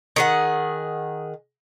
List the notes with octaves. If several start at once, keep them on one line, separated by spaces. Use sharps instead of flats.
D#3 G#4 F#5